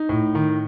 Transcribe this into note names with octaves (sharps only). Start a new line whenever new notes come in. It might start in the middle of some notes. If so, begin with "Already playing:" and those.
Already playing: D#4
A2
D#3